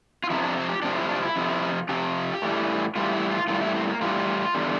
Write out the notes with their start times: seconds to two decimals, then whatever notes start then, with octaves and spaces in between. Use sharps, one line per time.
0.24 F4
0.30 F2 C3 F3 E4
0.43 D4
0.57 C4
0.69 G4
0.82 F2 C3 F3 D4
0.96 E4
1.09 D4
1.22 E4
1.36 F2 C3 F3
1.89 F2 C3 F3 G4
2.42 A2 E3 G3
2.96 A2 E3 G3 F4
3.13 E4
3.30 F4
3.48 A2 E3 G3 F4
3.61 E4
3.74 C4
3.88 A#3
4.01 A2 E3 G3 F4
4.54 E2 D3 G3